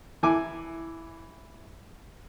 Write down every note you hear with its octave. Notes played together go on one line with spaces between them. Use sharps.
E3 E4 G#5 D6